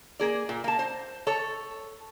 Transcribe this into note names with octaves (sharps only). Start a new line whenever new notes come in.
A#3 G#4 D5
A#2
A#3 A5
C5
A4 C#5